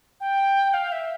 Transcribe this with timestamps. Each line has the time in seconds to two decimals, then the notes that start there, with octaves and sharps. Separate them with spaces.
0.21 G5
0.74 F5
0.92 E5